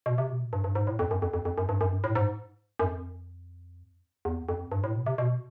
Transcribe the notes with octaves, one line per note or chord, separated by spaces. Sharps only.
B2
C3
B2
A#2
G2
G2
G#2
A2
F2
F#2
F2
F2
F2
F#2
G2
F#2
G2
A2
G#2
F#2
F2
E2
F2
G2
A2
B2
C3
B2